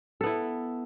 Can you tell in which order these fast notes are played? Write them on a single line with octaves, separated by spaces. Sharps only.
A4 B3 E4